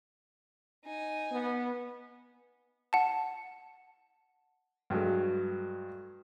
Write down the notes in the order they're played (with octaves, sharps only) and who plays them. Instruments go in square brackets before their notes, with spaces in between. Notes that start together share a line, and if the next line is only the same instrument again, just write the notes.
[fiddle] D#4 G#5
[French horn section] B3
[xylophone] F#5 A5
[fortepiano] G2 F#3 G#3 A3